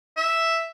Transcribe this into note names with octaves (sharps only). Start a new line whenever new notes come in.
E5